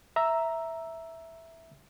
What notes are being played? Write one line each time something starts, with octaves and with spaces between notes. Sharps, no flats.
E5 A#5 E6